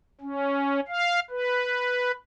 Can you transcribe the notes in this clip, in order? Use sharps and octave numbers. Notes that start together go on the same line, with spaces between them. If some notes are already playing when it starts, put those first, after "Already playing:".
C#4
F5
B4